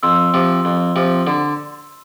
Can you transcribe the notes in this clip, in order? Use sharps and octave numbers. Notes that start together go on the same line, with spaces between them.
F2 C6 E6
C3 F3
F2
C3 F3
D3